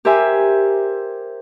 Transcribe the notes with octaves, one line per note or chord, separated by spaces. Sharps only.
G4 A#4 C5 E5 G#5